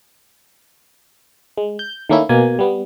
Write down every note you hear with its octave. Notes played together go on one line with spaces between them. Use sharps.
G#3
G6
D#3 A3 A#3 C#4 E4
B2 A#3 G#5
G3 B3